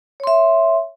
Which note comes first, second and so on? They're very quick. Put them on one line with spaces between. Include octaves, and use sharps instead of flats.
C#5 C6 E5